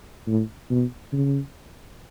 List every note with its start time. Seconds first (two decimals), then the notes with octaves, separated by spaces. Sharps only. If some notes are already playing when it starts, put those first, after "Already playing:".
0.27 A2
0.71 B2
1.13 C#3